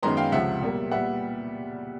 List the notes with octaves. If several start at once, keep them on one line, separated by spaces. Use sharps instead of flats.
F#2 D#3 G#3 B3 A#5 C6
F5 G5
C#2 C3 F3 E5 F#5
B2 G3 A#3
A#2 G3 B3 E5 F#5